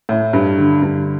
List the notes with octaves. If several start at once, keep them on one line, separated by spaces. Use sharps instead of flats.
A2
G2
D3
G2